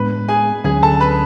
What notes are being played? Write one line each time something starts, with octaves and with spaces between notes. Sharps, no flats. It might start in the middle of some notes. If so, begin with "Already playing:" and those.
Already playing: A2 G#3 B3 D4 B4
G#4 G#5
D2 D3 F#3 C#4 G#4 G#5
A4 A5
B4 B5